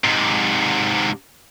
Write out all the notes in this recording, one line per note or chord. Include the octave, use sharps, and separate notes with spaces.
G#2 C3